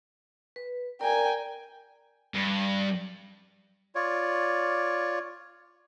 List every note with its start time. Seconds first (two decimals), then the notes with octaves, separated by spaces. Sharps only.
0.56 B4
1.01 A#4 D5 G5 G#5 A#5
2.34 G2
3.95 F4 C#5 D5